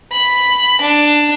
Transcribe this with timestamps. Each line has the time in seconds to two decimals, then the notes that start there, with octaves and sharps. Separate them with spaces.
0.12 B5
0.81 D4